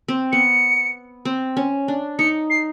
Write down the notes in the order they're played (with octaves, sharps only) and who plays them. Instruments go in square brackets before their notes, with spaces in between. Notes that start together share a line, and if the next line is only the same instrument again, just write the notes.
[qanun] C4
[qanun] B3 [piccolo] C#7
[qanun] C4
C#4
D4
[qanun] D#4 [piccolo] C#7
[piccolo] C7